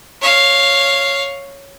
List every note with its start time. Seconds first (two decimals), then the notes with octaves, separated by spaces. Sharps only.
0.22 C#5 F5